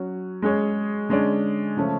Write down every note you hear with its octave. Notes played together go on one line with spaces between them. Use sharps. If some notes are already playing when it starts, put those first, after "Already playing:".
Already playing: F#3 C#4 F#4
G#3 C#4 G#4 C#5
D3 G#3 C#4 G#4 D5
C#3 F3 A3 C#4